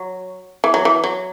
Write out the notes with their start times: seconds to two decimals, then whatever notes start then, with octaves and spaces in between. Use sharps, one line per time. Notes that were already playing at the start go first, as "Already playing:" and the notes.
Already playing: F#3
0.64 E3
0.74 F#3
0.85 E3
1.04 F#3